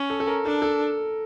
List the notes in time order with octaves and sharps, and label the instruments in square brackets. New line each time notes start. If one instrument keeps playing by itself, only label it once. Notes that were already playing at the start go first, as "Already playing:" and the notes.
Already playing: [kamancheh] C#4
[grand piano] A4
A4
A#4
[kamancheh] D4 [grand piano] A4
[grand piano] A4